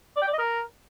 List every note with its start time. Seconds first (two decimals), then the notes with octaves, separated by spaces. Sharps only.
0.16 D5
0.22 G5
0.27 D5
0.33 D#5
0.39 A#4